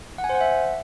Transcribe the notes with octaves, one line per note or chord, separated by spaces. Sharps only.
F#5
G#5
C5
F#5
E5